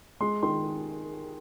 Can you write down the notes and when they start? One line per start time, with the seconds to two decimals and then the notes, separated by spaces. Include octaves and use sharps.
0.20 G#3 C6
0.43 D#3 C6